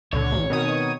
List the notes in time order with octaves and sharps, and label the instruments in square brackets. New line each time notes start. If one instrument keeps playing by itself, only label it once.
[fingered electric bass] C#2 A#2 [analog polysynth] D3 [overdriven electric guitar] C#5
[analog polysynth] A1
[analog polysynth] B2 D#3 D#6 [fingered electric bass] C4